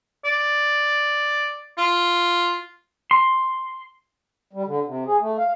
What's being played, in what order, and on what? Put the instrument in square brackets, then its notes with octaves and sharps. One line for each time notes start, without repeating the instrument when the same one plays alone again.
[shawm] D5
F4
[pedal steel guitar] C6
[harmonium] G3
D3
C3
G#4
A3
F5